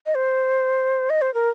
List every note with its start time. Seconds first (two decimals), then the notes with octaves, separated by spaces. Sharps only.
0.06 D#5
0.15 C5
1.10 D#5
1.22 C5
1.34 A#4